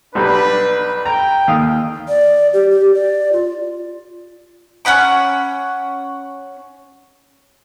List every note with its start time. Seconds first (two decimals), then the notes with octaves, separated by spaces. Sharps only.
0.15 B1 G3 D4 B4
1.06 G5 A#5
1.48 D#2 F5 D#6
2.08 D5
2.53 G4
2.70 G4
2.94 D5
3.32 F4
4.85 C#4 F#5 B5 D6